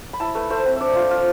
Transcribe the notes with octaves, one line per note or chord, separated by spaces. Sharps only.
B5
E4 A5
A3 B4
A3 C5
C4
D4 D5 E5
F4
F3 F5